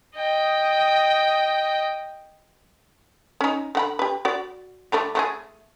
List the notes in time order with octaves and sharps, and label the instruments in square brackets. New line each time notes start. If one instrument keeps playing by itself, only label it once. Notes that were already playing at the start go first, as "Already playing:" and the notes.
[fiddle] D#5 G5
[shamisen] C#4 D#4
D3 F#5 B5
G4 B4
F#4 D5
D3 G3 A3
A3 F#4 G#4